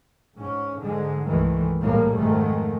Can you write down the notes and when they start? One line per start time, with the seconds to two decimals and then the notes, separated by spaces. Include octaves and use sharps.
0.38 G#2 C#4
0.80 G#2 D3 G#3
1.26 C2 G2 D#3 E3 G#3 A3
1.81 A#1 A2 D#3 G3 G#3 A#3
2.15 F2 G#2 D#3 G#3 A3